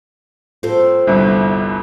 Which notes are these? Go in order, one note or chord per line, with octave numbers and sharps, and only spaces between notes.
A2 C4 F4 A4
G1 C2